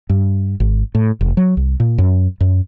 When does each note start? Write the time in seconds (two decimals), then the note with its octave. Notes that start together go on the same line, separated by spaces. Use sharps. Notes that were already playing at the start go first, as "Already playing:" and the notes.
0.10 G2
0.60 G#1
0.95 A2
1.21 F1
1.37 F#3
1.57 C2
1.80 A#2
1.98 F#2
2.41 F#2